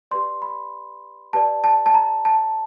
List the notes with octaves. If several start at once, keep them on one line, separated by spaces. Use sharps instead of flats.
G4 B4 D5 C6
B5
G4 B4 D5 A5
A5
A5
A#5
A5